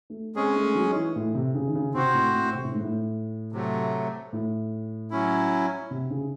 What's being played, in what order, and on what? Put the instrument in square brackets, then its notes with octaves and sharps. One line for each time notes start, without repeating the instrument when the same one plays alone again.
[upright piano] A3
[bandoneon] G#3 C#4 G#4 [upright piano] C4
[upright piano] A3
F#3
E3
A2
C3
C#3
D#3
C#3
[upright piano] C3 [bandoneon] C4 F#4 C5
[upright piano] A2
A2
C3
A2
G#2
A2
[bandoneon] C3 F#3 A3
[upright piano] A2
[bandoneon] F#3 C#4 E4
[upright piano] C3
C#3